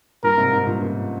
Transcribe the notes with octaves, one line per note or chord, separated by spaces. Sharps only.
G2 A#2 A#4
G#2 C3
G#2 C3
G2 A#2
A#2 C#3